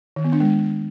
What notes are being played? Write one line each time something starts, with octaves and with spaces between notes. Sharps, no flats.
D#3
B3
D4
G#3